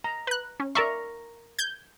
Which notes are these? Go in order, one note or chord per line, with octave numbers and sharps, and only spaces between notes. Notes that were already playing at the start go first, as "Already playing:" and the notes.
A#5
B4 F#6
C#4
A#4 D5 E5 A#5 C#6
G6 G#6